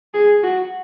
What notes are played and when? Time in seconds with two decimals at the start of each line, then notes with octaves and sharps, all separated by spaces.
0.14 G#4
0.43 F#4